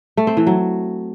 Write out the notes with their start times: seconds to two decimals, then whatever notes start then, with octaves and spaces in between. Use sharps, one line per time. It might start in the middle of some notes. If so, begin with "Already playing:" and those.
0.17 A3
0.27 C4
0.37 E3
0.47 F#3